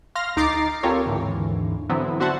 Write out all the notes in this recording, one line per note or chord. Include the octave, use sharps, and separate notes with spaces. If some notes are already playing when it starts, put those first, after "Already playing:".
F5 C6 F6 A#6
D2 D#4 A#5 D6 A6 C7
C4 F4 G4 A4 A#4 C#5
D#2 G#2 D3 E3
D3 E3 F#3 B3 C4 E4
D4 F#4 C5 E5 F#5 A5